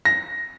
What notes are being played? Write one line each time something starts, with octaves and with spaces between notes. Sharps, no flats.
A#6